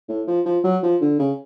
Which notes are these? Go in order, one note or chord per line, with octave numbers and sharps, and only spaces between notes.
A2
F3
F3
F#3
F3
D3
C#3